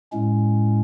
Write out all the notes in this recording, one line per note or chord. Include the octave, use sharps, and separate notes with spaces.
A2 G#3 C#4